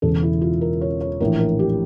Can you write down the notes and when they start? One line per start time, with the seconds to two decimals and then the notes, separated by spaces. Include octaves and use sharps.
0.02 E1 E2 C#3 E3 A4
0.23 E4
0.41 F4
0.61 A#4
0.81 C#5
1.01 C#5
1.20 A#1 A2 E3 A#4
1.40 A#4
1.59 G4